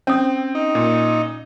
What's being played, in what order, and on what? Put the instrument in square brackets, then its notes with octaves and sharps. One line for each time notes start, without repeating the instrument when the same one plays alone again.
[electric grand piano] C4 [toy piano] C#4 D#6
[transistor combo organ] D#4
[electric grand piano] A#2